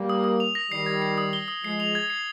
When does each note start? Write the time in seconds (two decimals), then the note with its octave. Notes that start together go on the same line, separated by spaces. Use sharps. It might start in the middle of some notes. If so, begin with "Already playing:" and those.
Already playing: G3 A#3
0.09 D#6
0.24 D#6
0.40 F7
0.55 A#6
0.71 D#3 G3 C7
0.86 G#6
1.02 C7
1.18 D#6
1.33 G7
1.48 D#6
1.63 F3 G#3 C7
1.80 F7
1.95 G#6
2.10 C7